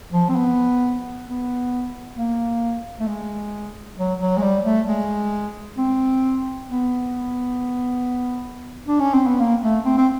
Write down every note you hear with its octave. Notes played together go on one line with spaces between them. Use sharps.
F3
C4
B3
B3
A#3
A3
G#3
F#3
F#3
G#3
G3
A3
G#3
C4
B3
D4
C#4
C4
B3
A#3
A3
C4
C4